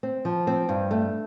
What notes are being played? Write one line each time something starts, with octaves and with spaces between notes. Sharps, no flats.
C4
F3
C4
G2
A3